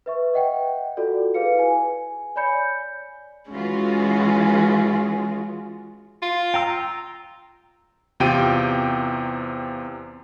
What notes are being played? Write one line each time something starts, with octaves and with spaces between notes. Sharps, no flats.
B4 E5 C#6
D#5 F#5 G5
F4 F#4 A4 D5
E4 G#4 B4 F5 C#7
G#5
C#5 D5 G#5 B5 G6 C#7
E3 G#3 C#4 F4 F#4
F4
G5 A#5 E6
E2 C3 F4 G4 G5 D#7